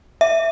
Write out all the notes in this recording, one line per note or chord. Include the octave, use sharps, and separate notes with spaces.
E5